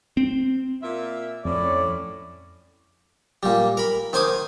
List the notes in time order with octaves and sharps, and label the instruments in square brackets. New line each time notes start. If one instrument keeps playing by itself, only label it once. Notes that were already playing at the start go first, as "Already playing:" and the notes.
[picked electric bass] C4
[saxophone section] A#2 F4 E5
[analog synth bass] F2 [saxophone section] A2 C#4 [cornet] D5
[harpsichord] A#2 G3
A#4 B5
D#3 C5 G#5 D6 D#6